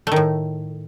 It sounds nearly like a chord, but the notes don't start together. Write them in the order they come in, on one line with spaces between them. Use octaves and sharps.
A3 D#3 A2